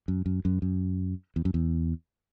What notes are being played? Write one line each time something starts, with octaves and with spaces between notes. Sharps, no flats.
F#2
F#2
F#2
F#2
E2
F#2
E2